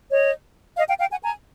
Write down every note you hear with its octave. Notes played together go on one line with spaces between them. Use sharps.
C#5 D#5
D#5 F5
F5 G5
F5 G5
F#5 G#5
G#5 A#5